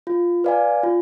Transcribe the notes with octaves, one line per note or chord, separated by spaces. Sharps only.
F4
B4 D5 F5 G#5
F4